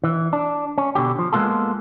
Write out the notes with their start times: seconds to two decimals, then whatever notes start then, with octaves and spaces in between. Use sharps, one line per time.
0.04 E3
0.33 D4
0.78 C#4
0.95 B2 D3 G4
1.19 F3
1.33 G#3 A#3 B3 F4 A4